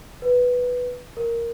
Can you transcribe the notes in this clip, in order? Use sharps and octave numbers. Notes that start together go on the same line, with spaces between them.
B4
A#4